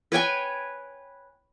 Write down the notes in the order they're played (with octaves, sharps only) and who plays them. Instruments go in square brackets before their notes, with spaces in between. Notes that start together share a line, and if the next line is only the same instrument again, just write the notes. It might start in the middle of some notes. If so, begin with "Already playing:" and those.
[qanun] B4 C#5 G5 G#5